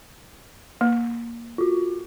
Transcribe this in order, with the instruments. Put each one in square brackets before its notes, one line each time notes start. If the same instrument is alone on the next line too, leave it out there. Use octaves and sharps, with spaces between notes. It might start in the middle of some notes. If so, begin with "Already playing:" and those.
[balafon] A#3
[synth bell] F4 F#4